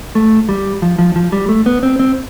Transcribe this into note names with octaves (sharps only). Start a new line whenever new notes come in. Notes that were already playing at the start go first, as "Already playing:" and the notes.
A3
G3
F3
F3
F3
G3
A3
B3
C4
C4